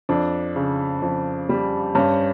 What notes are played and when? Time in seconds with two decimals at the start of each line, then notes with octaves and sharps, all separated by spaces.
0.09 F2 D4
0.56 C#3
1.02 F2
1.49 G3
1.95 G2 C#4